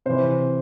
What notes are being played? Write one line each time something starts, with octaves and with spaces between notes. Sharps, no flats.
C3 E3 C5